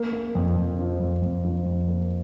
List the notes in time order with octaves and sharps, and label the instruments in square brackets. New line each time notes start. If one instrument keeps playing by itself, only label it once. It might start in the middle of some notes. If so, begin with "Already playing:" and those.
Already playing: [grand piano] A#3
A#3
F2
F2
F3
F2
F2
F3
F2
A#3